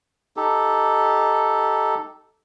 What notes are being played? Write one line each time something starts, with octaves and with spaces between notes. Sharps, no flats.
D#4 G4 A4